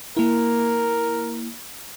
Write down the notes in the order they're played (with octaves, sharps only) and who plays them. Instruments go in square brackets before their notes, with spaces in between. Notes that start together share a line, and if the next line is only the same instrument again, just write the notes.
[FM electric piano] A#3 E4 [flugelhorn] A#4